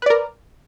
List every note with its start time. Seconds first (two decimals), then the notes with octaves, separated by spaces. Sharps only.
0.02 B4
0.06 D5
0.10 A#4